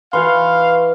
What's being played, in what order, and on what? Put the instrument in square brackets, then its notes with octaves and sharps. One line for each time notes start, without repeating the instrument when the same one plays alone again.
[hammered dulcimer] E3 [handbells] F#4 B4 C6 [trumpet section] F5